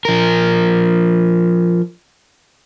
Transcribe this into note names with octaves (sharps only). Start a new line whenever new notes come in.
F3 A#4